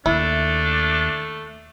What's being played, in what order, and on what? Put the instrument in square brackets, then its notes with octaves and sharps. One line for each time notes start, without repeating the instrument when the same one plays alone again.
[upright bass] D#2 [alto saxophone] A3 [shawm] D4 [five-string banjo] E4